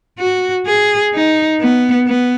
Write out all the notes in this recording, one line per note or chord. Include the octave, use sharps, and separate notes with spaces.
F#4
G#4
D#4
B3
B3